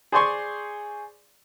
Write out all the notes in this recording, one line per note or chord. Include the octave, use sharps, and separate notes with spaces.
G#4 C5 D5 G#5 C6 C#6